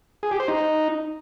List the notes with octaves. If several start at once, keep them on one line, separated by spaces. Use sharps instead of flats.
G#4
G4
C5
D#4